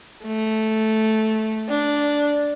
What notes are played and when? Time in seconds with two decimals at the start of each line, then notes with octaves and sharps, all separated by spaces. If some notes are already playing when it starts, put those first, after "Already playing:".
0.24 A3
1.69 D4